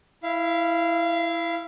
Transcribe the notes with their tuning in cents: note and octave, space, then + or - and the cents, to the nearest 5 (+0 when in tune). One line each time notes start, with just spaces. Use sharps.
E4 +0 F5 -25